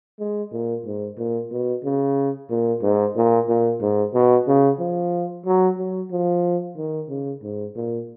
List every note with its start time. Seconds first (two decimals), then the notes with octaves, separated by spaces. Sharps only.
0.20 G#3
0.52 A#2
0.85 G#2
1.18 A#2
1.51 B2
1.84 C#3
2.50 A#2
2.82 G#2
3.16 A#2
3.49 A#2
3.81 G#2
4.14 B2
4.48 C#3
4.80 F3
5.46 F#3
5.78 F#3
6.12 F3
6.78 D#3
7.09 C#3
7.43 G#2
7.76 A#2